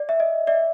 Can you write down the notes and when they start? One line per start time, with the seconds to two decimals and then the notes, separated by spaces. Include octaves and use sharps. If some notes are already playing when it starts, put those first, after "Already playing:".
Already playing: D5
0.09 E5
0.20 D#5
0.47 D5 E5